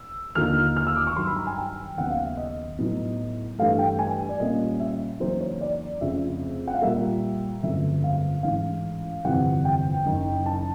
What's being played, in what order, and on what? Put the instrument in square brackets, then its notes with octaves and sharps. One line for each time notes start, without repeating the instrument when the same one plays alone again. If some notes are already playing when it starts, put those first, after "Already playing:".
Already playing: [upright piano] E6
D#2 D3 F3 A#3 D#4 F6
F6
E6
D6
C#6
G2 D#3 F#3 C6
B5
A#5
G#5
G5
D#2 C#3 F#3 B3 F#5
F5
E5
D#5
A2 F#3 B3 D#4
G2 E3 A3 F5
G5
G#5
D5
A#2 G3 A#3 C#4 D#5
E5
E2 C#3 F#3 A#3 D#4 C5
C#5
D5
F1 F2 C#3 F3 E5
F#5
F5
A#2 G3 A#3 E5
G1 F2 C#3 F#3 A3 E5
F5
A1 G#2 E3 F5
G1 F2 C3 E3 F#5
G5
F#1 F#2 D#3
A5